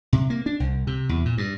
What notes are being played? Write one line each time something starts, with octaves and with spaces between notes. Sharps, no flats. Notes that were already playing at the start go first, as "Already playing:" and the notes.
C3
A#3
D4
C2
C3
E2
A#2
G2